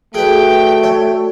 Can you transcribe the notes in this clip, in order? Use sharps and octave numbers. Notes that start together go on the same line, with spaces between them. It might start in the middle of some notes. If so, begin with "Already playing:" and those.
A3 F#4 G#4 B4 D5 G5
C#5